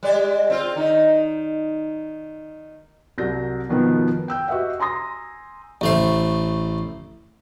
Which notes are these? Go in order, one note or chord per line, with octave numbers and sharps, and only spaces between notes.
G3 G#3 D5
C4 F4
D#3 D#4
C2 F#3 G6 A#6
B2 D#3 F3 B3
G5 E6 G6
F#4 G4 B4 D#5 E5 F#5
G#5 A#5 C6 D#6 A#6
A1 A3 C5